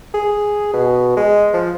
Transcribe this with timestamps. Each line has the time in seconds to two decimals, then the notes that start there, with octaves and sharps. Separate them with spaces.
0.14 G#4
0.73 B2
1.17 G#3
1.54 F3